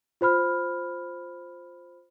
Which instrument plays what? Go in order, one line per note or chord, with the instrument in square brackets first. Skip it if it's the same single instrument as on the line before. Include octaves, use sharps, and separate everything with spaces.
[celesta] F4 C5 B5 F6